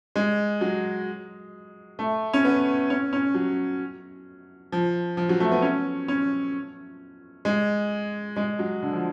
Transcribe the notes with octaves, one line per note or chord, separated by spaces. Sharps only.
G#3
F#3
A3
C#4
B3
C#4
C#4
F#3
F3
F3
F#3
A3
B3
C#4
C#4
G#3
G#3
F#3
D3
F3